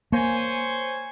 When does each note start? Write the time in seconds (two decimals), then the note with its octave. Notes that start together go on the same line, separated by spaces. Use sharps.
0.12 A#3 C5 C#5 G#5